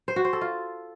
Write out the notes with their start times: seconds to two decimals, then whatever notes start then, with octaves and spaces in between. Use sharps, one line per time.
0.08 C5
0.16 F#4
0.25 C5
0.33 A4
0.41 F4